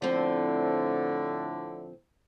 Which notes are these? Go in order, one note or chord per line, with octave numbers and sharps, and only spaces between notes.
A2 D3 F3 C4